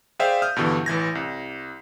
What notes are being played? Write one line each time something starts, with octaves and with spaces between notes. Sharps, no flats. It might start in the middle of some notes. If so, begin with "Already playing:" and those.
G#4 C5 D5 E5 F5 G5
D#6 F6 G6
G2 B2 D3 E3
A1 E3 G#6 A#6
C2